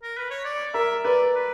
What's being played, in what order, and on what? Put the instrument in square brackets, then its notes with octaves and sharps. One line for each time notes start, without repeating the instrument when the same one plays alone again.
[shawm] A#4
B4
C#5
D5
[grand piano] A#4 [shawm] E5
[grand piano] B4 [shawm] D5
[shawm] B4